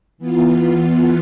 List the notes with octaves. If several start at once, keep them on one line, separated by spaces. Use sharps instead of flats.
E3 B3 F4